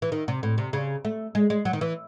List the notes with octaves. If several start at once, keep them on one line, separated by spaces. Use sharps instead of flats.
E3
D#3
C3
A2
C3
C#3
A3
G#3
G#3
F#3
D#3
E3